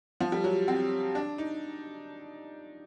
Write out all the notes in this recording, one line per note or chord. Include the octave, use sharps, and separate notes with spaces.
F3
G3
F#3
C4
D4
D#4